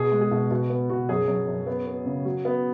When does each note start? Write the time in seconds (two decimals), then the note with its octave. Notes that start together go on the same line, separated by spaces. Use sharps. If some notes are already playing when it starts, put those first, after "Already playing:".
Already playing: B2 G#4
0.11 G#3
0.21 G#4
0.31 B2
0.51 B2 F#4
0.70 B3
0.89 B2 F#4
1.09 F#2 G#4
1.28 F#2
1.47 F#2
1.67 B3
1.87 B3
2.06 C#3
2.25 F#3
2.45 B3